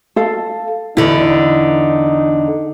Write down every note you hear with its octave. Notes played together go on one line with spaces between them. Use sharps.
A4 F5
E2 D3 D#4 E4